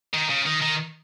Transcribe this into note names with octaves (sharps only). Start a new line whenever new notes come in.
D#3
C#3
D#3
D#3